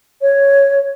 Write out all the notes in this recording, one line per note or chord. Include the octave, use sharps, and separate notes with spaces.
C#5